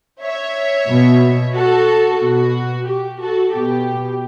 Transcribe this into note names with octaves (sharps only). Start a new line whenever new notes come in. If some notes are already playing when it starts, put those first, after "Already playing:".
C#5 E5
B2
F#4 A4
B2 F#4
G4
F#4 A4
B2 G4